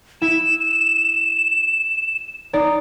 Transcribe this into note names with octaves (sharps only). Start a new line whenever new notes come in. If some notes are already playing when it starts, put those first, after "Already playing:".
E4 E7
D#4 D5 A#5